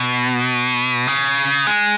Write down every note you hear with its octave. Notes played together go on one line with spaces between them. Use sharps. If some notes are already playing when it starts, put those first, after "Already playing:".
Already playing: B2
C#3
G#3